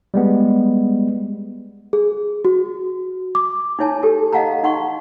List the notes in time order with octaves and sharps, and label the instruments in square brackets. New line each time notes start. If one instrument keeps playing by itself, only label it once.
[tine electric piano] G3 G#3 B3
[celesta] G#4
F#4
D6
[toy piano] D#4 E4 C#5 G#5 A5
G4 A4
D#5 F5 F#5 A5 A#5
D#4 F#5 C6 C#6